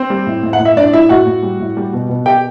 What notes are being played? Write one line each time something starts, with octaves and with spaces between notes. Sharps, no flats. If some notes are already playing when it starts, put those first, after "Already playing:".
Already playing: C4 C5
G3
A2
A2
F#5
A2
E5
A2 D4 D5
A2 E4 E5
A2 F#4 F#5
A2
G3
A2
G3
B2
B2
B2 G4 G5